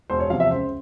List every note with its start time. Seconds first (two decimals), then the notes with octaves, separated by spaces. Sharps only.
0.10 E1 C5
0.20 C#5
0.30 E2 C3 F3 F5
0.40 E5
0.51 C#2 C5